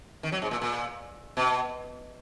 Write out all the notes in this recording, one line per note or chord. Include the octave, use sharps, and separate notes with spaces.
D#3
F#3
G#2
A#2
A#2
B2